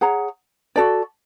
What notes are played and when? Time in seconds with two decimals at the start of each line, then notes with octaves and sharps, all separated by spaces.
0.01 G#4 C#5 F#5 A#5
0.76 F#4 A4 D5